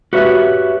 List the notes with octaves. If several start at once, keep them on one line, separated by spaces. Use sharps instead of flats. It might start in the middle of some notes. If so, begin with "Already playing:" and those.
F#4 G4 B4 C#5 E5